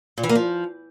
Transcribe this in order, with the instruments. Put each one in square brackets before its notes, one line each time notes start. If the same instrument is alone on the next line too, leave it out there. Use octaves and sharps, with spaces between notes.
[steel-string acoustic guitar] A#2
E3
A#3
F3